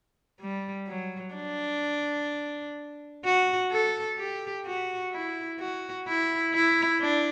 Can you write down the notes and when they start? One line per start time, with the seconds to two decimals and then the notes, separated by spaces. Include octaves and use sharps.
0.40 G3
0.87 F#3
1.34 D4
3.25 F#4
3.72 A4
4.18 G4
4.66 F#4
5.12 E4
5.60 F#4
6.08 E4
6.54 E4
7.01 D4